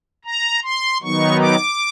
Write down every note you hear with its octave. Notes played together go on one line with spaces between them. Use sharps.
A#5
C6
D#3 F#3 B3 D#4 C#6
D6